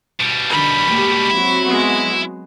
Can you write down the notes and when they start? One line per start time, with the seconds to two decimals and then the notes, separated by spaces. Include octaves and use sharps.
0.20 B2 G3
0.50 D3 D#3 B5
0.91 G#3 A#3 G4
1.31 F#3 C4 E4 F#4
1.64 G#3 B3